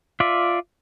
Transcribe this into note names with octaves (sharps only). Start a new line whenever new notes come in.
F4 D5 E5